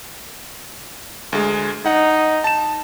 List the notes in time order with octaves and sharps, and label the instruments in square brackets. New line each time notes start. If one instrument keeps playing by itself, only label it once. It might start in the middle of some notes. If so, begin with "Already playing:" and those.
[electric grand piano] D2 G#3
[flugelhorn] D#4 [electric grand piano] F#5
[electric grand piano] A5 E7